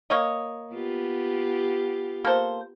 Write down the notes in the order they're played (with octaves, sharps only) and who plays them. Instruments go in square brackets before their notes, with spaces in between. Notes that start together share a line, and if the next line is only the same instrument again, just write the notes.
[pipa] A#3 C#5 D#5
[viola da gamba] B3 F4 G4
[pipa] A#3 A4 C5